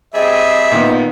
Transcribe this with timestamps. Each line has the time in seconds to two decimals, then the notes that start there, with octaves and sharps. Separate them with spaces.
0.14 G3 C4 G#4 D#5 E5
0.72 A#2 D#3 B3